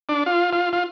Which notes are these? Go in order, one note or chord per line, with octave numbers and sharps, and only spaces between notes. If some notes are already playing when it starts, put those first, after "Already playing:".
D4
F4
F4
F4